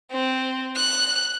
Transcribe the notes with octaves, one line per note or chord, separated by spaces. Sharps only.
C4
F#6